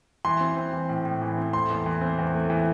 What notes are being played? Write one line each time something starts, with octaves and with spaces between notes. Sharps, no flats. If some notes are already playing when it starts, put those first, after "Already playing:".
E3 C6
C4
C4
E3
A2
A2
E3
C4
A3 C6
E2
E3
C4
E2
A3
E3